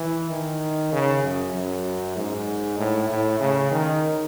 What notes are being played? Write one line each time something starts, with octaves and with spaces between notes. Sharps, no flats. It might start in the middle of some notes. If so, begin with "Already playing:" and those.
Already playing: E3
D#3
C#3
F#2
F#2
G#2
A2
A2
C#3
D#3